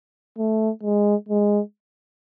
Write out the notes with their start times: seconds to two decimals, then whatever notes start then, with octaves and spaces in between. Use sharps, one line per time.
0.38 A3
0.83 G#3
1.29 G#3